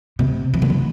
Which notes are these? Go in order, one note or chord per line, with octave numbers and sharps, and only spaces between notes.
C3
E3
D3
E3